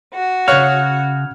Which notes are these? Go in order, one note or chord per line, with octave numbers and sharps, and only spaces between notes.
F#4
C#3 C#5 F5 F6 F#6 G#6